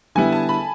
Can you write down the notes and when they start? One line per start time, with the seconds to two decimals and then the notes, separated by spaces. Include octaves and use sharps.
0.15 D3 G3 B3 E4 G#5
0.32 A5
0.49 B5